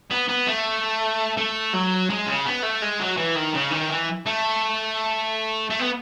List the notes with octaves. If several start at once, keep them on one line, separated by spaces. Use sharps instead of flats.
B3
B3
A3
A3
F#3
G#3
C#3
B3
A3
G#3
F#3
E3
D#3
C#3
D#3
E3
A3
A3
B3